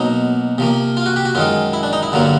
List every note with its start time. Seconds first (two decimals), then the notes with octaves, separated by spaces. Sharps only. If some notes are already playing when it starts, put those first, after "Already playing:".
Already playing: B2 F#3 A#3 D#4
0.58 C3 F3 A#3
0.97 F4
1.06 F#4
1.16 G4
1.25 F#4
1.35 F#2 D#3 G#3 F4
1.73 E4
1.83 D4
1.93 D#4
2.03 E4
2.12 G2 D3 F#3 A#3